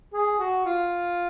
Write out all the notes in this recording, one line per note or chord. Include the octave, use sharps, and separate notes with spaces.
G#4
F#4
F4